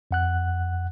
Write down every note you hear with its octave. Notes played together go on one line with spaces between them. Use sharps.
F2 F#5 F#6